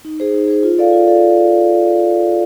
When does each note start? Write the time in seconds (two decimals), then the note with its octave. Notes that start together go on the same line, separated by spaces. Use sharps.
0.05 D#4
0.20 G#4 C5
0.34 D#4
0.48 G#4 C5
0.63 F4
0.78 A4 D5 F5
0.93 F4
1.07 A4 D5 F5